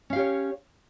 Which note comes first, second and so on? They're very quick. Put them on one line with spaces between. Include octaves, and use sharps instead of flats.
C#4 F5 G4 C#5